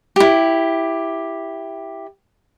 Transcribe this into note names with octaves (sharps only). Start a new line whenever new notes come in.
E4 G4